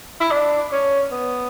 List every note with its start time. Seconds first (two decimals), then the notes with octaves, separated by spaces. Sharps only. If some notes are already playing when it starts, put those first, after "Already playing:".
0.21 E4
0.31 D4
0.72 C#4
1.12 B3